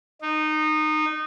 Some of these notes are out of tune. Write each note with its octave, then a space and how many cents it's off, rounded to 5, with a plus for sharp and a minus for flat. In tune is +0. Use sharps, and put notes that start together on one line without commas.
D#4 -20